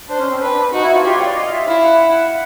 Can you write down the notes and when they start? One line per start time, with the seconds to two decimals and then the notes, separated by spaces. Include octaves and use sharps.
0.09 D4 C5
0.19 C#4
0.30 C4
0.41 D4 B4
0.52 D4
0.73 D#4 F#4
0.83 E4
0.94 F4
1.05 F4 G4
1.15 C#5
1.26 D5
1.35 D#5
1.46 F5
1.52 E5
1.67 E4 F5
1.83 F#5